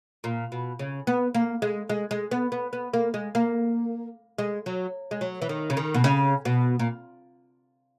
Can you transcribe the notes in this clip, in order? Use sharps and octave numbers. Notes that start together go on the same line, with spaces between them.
A#2
B2
C#3
B3
A#3
G#3
G#3
G#3
B3
B3
B3
A#3
G#3
A#3
G#3
F#3
G#3
F#3
E3
D#3
C#3
D#3
B2
C#3
B2
A#2